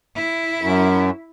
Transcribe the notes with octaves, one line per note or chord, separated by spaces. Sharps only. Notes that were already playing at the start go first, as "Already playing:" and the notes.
E4
F#2